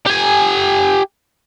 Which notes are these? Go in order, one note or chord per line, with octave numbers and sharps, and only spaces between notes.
G4 G#5